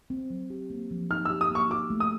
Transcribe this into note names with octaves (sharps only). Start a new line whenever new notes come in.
C4
F#3
G4
A#3
F3
D#4 F6
E6
G4
D#6
A#3 C#6
F#4 D6
A3
D#6